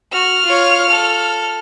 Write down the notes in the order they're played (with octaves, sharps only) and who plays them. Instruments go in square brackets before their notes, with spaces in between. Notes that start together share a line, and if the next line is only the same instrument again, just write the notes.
[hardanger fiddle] F#4 [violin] F6
[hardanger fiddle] F4 C#5
A4